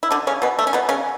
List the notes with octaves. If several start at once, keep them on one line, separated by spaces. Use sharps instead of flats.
E4
D3 D4
C#3 C#4
B2 B3
A3
C#4
B2 B3
C#3 C#4